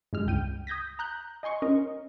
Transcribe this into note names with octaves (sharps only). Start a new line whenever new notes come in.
G2 G#3 F6
C#2 G5 D#7
D#6 G6 G#6 A#6 B6
A#5 F#6 G6
D#5 G#5 C6 C#6
C#4 A#4 D#5